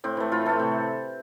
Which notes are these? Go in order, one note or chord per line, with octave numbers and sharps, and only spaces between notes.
A2 C4
E3 A3
A2 F4
E3 A3 A4
C3